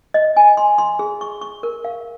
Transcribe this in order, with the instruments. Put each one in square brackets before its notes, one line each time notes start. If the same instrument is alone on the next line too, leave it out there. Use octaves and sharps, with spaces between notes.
[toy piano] D#5
G#5
C6
C6
G#4
C#6
C#6
A#4
F5